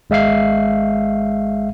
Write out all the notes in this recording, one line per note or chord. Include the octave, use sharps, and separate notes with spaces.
G#1 G#3 E5 F5 C7